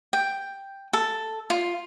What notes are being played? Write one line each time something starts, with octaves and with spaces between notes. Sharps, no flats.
G5
A4
F4